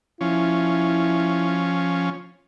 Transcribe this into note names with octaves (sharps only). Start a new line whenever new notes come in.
F3 C#4 E4